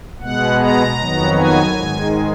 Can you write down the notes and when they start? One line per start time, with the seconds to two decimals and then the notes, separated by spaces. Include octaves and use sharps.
0.20 B2 G#3 B3 F#5
0.59 A#5
0.99 F2 D#3 F#3 B3
1.38 G#5
1.77 G#2 D#3 G#3